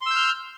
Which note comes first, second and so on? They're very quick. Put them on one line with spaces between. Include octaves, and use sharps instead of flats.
C6 E6 G6 F6